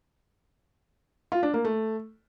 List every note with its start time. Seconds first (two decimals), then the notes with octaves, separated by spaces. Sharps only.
1.32 F4
1.43 D4
1.54 A#3
1.65 A3